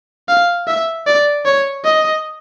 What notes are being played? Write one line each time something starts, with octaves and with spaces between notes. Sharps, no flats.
F5
E5
D5
C#5
D#5